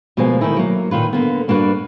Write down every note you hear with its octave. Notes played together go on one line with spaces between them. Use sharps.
D2 B2 F3 G#3 A#3 G#5
D#3 E3 A3 D#4 E4 A#4
F#3 A#3
A#2 D#3 F4 B4
D3 A#3 B3
G2 A#3 D4 F#4 B4